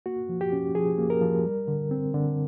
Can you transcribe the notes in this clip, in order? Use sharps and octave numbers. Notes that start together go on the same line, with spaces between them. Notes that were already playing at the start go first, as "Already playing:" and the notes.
A#3 F#4
F3
G4
C#4
F3 G#4
A#3
A#4
F3
G3
D3
C4
D3